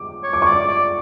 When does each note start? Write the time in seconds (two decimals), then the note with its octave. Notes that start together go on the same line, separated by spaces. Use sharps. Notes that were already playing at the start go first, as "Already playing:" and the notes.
Already playing: D6
0.23 C#5
0.33 D6
0.42 D5 C#6
0.52 D6
0.68 D5